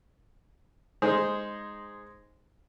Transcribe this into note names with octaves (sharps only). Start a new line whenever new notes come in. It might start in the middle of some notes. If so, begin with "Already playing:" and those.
G#3 D#4 G#4 C5